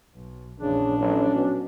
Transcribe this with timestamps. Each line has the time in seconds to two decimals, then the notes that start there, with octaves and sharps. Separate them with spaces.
0.15 B1
0.60 A#1 E2 C#3 D4
0.99 A1 F#3 C#4
1.34 B2